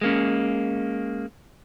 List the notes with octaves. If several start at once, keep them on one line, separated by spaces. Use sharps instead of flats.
G#3 A#3 C#4